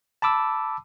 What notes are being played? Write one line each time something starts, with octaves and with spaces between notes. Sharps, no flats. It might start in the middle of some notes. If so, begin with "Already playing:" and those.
A5 B5 D6 E6